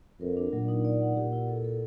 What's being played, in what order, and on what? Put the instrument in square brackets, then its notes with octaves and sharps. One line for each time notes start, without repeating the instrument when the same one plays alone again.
[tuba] F2 [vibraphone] A#4
[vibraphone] D4
[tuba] A#2 [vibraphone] F#3
[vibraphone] D#4
D5
F#5
[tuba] A#2 [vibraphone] G4
[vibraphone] E4
A4
A4